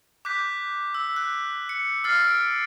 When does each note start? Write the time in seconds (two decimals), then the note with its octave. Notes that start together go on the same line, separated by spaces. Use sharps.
0.25 D6 F#6 G6 B6
0.94 E6
1.16 F#6
1.69 C#7
2.04 E6 F6 A6 C7
2.27 D7